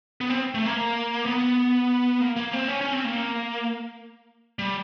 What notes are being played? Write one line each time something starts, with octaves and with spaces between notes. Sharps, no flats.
B3
C4
A3
A#3
B3
A#3
A#3
C4
C#4
C#4
C4
A#3
G3